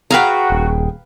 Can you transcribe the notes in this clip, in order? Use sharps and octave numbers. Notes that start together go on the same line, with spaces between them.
F#4 G#4 B4 F5 G5 A#5
D#1